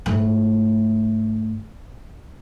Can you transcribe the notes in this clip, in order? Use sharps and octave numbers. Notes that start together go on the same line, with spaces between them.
G#2 A3